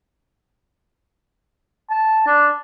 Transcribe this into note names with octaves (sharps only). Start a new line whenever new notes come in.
A5
D4